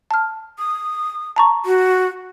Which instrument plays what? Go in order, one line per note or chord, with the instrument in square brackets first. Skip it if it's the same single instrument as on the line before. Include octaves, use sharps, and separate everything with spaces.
[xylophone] A5 F6
[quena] D#6
[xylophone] A5 A#5 C#6
[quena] F#4